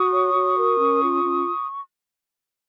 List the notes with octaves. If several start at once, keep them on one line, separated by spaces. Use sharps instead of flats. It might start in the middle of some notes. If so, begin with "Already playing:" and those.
Already playing: F#4 C#6 D#6
C#5
F#4
A#4
C#4
F4
C#4